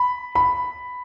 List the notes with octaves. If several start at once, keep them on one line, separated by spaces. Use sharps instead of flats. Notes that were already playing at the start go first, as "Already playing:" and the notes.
Already playing: B5
B5